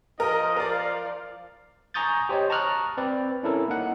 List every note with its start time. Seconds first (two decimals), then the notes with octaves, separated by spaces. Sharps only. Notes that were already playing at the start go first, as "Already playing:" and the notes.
0.20 F3 A#4 D#5
0.56 A#4 D5 F5
1.94 G#5 A#5 C#6 D#6 G6 A6
2.29 G4 C5 C#5 D#5
2.50 A5 A#5 C#6 D#6 F6 F#6
2.97 C4 B4 D5
3.43 C#4 E4 A4 A#4
3.68 A#3 D#4 F#5